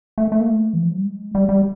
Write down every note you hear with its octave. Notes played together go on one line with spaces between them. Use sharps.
A3
A3
A#3
A3
E3
F3
F#3
G3
G#3
G3
G3